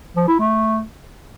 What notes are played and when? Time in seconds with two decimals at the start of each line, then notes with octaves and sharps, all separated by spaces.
0.16 F3
0.28 E4
0.40 A3